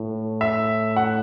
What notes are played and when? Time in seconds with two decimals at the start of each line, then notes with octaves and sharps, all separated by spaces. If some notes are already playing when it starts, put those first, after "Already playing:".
Already playing: A2
0.41 E5
0.96 F#5